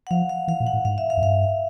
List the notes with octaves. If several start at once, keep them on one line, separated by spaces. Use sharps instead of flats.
F#5
F3 F5
F5
E3 F5
A#2
F#5
A2
G#2 F5
E5
F5
F#2
G2 F5